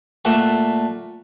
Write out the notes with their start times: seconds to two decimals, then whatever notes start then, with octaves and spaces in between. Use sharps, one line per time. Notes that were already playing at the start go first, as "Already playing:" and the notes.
0.25 A#2 A3 F#5 A5